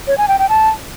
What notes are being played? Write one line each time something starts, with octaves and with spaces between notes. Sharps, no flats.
C#5
G#5
G5
G5
A5